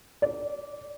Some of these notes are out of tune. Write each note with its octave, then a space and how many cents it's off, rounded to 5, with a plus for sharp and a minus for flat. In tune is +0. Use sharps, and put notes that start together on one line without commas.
D5 -15